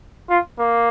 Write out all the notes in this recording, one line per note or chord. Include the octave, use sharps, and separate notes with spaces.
F4
A#3